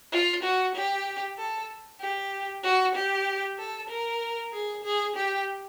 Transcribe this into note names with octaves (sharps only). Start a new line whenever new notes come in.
F4
F#4
G4
A4
G4
F#4
G4
A4
A#4
G#4
G#4
G4